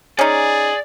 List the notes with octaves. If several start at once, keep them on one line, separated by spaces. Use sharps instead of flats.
C#4 D#4 G#4 D5